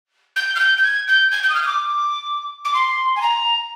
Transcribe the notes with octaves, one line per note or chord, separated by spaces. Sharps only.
G6
F6
G6
G6
G#6
G6
G#6
G6
D#6
F6
D#6
D6
D6
C6
G#5
A#5